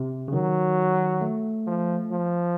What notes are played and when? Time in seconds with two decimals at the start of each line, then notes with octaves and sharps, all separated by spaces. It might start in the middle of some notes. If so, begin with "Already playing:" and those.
Already playing: C3
0.28 C#3
0.33 D#3 F#3
1.21 A3
1.67 F3
2.11 F3